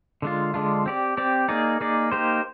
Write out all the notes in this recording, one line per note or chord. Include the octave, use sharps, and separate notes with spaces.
D3 G#3 D4 F4
D3 G#3 D4 F4
C4 G4 D5
C4 G4 D5
A#3 D#4 G#4 D5
A#3 D#4 G#4 D5
A#3 D#4 G4 C5